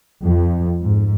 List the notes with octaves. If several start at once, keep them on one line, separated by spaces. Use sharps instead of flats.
F2
G#2